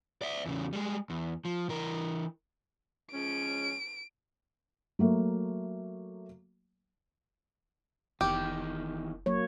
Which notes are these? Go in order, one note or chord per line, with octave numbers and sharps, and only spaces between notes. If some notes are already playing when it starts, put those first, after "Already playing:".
D5 E5
E2 C#3
G3 G#3
E2
F3
E3 A#4
F3 G#3 C#4 D7
F#3 A3 A#3
F1 E2 D#3 G4
F#3 A#3 C#5